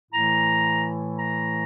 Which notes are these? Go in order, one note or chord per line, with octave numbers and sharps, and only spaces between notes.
A2 E3 A3 E4 A#5
A#5